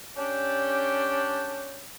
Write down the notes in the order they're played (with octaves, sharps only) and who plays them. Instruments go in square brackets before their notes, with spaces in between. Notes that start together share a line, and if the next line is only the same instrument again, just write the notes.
[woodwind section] C#4 D4 G4